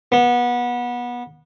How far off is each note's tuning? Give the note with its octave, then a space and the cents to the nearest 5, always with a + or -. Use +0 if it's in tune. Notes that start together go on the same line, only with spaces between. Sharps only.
B3 -25